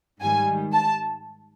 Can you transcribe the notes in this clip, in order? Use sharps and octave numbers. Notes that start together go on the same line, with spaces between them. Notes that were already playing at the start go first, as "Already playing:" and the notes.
G#2 D#3 G3 G#5
A5